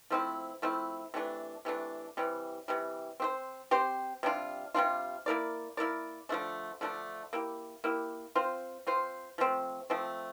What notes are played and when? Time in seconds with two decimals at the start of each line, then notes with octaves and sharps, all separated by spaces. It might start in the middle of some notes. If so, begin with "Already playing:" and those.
0.10 F3 A3 C4 E4
0.62 F3 A3 C4 E4
1.14 C3 E3 A3 D4
1.65 C3 E3 A3 D4
2.17 C3 E3 G3
2.68 C3 E3 G3
3.20 C4 G4 C5
3.71 C4 G4 C5
4.23 C3 G3 D4 F4
4.74 C3 G3 D4 F4
5.26 A#3 E4 A#4 D5
5.77 A#3 E4 A#4 D5
6.29 D3 F3 A3 D4
6.81 D3 F3 A3 D4
7.33 A#3 E4 G4
7.84 A#3 E4 G4
8.35 C4 F4 C5
8.87 C4 F4 C5
9.38 F3 A3 C4
9.90 F3 A3 C4